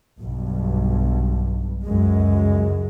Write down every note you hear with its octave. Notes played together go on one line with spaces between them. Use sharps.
B1 G2
C#2 F#2 G#3